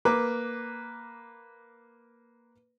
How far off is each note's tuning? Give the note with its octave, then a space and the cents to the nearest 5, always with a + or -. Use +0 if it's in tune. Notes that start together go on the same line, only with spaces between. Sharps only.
A#3 +0 B4 +0 D6 +0